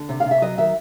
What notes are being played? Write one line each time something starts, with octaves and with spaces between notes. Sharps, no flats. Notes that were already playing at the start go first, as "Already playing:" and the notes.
Already playing: D3
C3
F5
C3
E5
F#3 D#5
D#3 E5